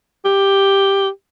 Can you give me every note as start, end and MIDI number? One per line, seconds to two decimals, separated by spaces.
0.25 1.08 67